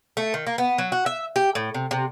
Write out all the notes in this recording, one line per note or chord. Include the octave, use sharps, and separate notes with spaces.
A3
D#3
A#3
B3
F#3
F#4
E5
G4
A2
C3
C3